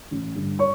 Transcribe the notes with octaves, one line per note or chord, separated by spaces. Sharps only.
A1
G2 D3
C#5 C#6